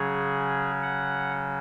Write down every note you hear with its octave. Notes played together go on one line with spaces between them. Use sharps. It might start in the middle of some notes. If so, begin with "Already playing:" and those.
Already playing: C#3 F#3 C#4 G#4
F#5